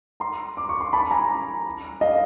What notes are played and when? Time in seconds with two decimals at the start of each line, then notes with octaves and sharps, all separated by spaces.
0.20 A#5 C6
0.57 D6
0.69 C#6
0.81 C6
0.93 A5 B5
1.11 G#5 A#5
2.01 D#5 F5